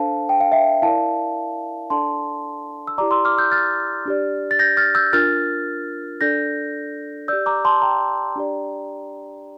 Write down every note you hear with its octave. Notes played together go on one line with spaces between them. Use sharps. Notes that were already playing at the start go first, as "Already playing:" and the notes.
Already playing: D4 A4 C5 F5 A5
G5
F5
E5 G5
E4 A#4 D5 F5 A5
D4 A4 D5 A5 C6
E6
E4 G4 D5 A#5 D6
C6 E6
D6 F6
E6 G6
F6 A6
D4 G4 D5
A6
G6 A#6
F6 A6
E6 G6
D4 F4 A#4 F6 A6
D4 A4 D5 G6 A#6
G4 D5 E6 G6
A#5 D6
A5 C6
G5 A#5
D4 G4 D5